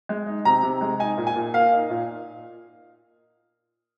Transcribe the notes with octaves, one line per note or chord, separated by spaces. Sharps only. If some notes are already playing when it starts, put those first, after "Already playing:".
G#3
D#4
C3 A#5
C3
G#3
D#4 G#5
A#2
G#5
A#2
A#3 F5
D#4
A#2